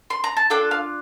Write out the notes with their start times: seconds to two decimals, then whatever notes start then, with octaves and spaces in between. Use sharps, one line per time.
0.10 C6
0.24 A#5
0.37 A5
0.50 D4 F4 A4 G5
0.71 F5